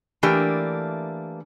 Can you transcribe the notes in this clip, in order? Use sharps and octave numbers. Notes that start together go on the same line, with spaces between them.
E3 A3 A#3 D4 G4 A#4